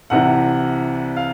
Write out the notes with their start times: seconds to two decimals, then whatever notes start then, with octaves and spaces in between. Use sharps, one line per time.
0.10 C2 C3 E3 F#5
1.17 F5